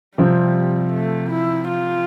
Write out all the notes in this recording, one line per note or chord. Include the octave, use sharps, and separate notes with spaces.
C3 F3 G3 C4
A3
E4
F4